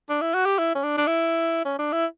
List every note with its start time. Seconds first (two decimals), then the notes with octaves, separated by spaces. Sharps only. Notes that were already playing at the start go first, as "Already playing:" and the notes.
0.09 D4
0.22 E4
0.34 F#4
0.46 G4
0.59 E4
0.75 C#4
0.84 D4
0.97 D4
1.07 E4
1.65 C#4
1.79 D4
1.93 E4